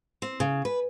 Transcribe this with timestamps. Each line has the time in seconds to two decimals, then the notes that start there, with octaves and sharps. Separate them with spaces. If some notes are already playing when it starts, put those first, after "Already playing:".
0.22 C4
0.40 C#3
0.65 B4